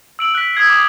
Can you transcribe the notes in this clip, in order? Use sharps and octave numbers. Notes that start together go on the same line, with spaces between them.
E6 D7 F#7
F#6 B6
D#6 E6 G#6 C7
D6 D#6